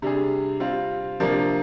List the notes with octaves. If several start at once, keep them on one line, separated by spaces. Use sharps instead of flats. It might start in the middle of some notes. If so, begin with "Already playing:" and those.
C3 G3 D4 G#4
G3 C4 F4
C3 F3 A#3 D4